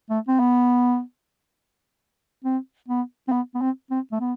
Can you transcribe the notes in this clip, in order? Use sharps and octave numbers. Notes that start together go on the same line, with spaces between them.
A3
C4
B3
C4
B3
C4
B3
B3
C4
C4
A3
B3